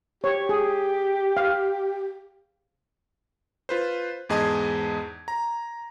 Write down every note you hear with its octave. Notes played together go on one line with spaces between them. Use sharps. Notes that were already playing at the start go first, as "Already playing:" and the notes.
G4 C#5
G#4
F5
F4 B4 C5
E2 G#2 G#4 D#5 A5 G#6
A#5